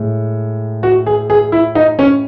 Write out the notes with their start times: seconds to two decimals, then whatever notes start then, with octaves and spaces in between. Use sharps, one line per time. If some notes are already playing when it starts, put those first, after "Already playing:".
Already playing: A2 G#3
0.83 F#4
1.06 G#4
1.30 G#4
1.52 E4
1.75 D#4
1.99 C#4